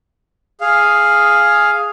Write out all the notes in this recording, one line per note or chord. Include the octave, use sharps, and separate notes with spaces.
G#4 F5